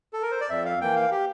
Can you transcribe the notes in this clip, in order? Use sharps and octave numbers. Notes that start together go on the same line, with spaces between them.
A4
A#4
C5
D5
F2 E5
F5
E3 A#3 G5
F5
G4